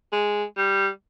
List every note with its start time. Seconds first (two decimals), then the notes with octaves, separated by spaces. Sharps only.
0.12 G#3
0.57 G3